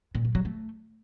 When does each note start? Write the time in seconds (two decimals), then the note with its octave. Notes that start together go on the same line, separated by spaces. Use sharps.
0.15 A#2
0.25 F#3
0.35 F#3
0.45 A3